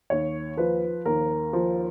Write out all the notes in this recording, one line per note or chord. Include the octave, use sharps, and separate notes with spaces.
D#2 C#5
F3 B4
D#2 A#4
F3